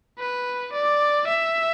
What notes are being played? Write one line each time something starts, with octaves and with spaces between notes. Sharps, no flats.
B4
D5
E5